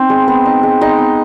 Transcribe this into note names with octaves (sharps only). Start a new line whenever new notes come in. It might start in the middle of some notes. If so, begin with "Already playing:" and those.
Already playing: B3 C4 D#4
G#3
B3
D#4
G#3
G#3 D#4 D#5
B3